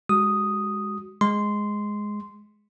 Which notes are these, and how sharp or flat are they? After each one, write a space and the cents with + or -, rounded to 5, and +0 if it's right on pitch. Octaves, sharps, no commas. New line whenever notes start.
G#3 -10 F#4 +20 D#6 +0
G#3 +0 C6 -10